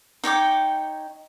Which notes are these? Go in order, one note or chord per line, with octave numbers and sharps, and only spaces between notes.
D#4 C#5 G5 D6